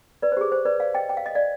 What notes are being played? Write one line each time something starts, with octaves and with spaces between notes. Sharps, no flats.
B4 D5
C5
G4
G#4
C5
B4 D5
D5 F5
D#5 G5
G5
F5
D#5
D5 F5